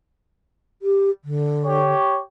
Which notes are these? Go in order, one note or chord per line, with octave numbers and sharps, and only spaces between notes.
G4
D3
G4 C#5